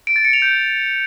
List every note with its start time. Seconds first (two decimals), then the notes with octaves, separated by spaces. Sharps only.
0.07 D7
0.16 A6
0.25 C#7
0.33 F7
0.42 G6